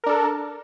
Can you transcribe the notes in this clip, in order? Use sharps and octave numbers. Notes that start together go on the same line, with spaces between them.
D4 A4 A#4